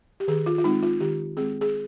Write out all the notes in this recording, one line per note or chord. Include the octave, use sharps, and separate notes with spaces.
G4
D#3 G#4
F4
F4
G#3 C4 D#4
F4
D#3 G4
G#3 C4 G#4
G#4